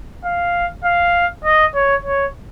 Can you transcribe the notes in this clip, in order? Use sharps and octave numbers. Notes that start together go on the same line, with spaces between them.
F5
F5
D#5
C#5
C#5